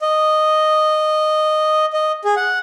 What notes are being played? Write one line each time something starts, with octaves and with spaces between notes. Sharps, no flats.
D#5
D#5
G#4
F#5